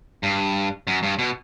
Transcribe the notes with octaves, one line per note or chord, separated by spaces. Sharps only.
G2
F#2
G2
B2